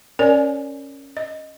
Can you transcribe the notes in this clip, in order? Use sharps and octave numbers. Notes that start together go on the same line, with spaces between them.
C#4 A#4 C#5 D5 G#5
D#5